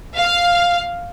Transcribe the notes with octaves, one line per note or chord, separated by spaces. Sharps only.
F5